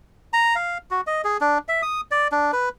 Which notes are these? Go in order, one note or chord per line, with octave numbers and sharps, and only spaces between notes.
A#5
F5
F#4
D#5
G#4
D4
E5
D#6
D5
D4
B4